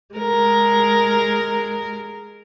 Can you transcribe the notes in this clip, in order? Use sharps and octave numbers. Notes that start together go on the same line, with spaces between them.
G#3 A#4